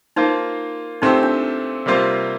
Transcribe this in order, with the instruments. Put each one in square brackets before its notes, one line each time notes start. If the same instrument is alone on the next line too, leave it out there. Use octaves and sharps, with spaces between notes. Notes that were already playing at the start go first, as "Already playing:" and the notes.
[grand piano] A#3 F4 C5 [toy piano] D#4
[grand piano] A#2 A3 C4 G4 C5 [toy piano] D#4
[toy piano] D4
[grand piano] C3 G3 A#3 F4 C5